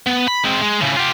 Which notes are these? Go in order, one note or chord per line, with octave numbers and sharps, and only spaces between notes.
B3
B5
G#3 C4
G#3
A2 C#3
F4 G4